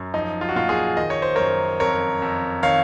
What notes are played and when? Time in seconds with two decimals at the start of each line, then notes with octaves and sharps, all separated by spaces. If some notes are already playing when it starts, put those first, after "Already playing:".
Already playing: F#2
0.13 F3 D#4
0.41 F4
0.49 F#4
0.56 A#2 F4
0.69 F4 G#4
0.97 D#3 D#5
1.10 C#5
1.22 C5
1.35 F#2 A#4 C#5
1.80 F2 A#4 C#5
2.22 F2
2.63 D#3 C#5 F5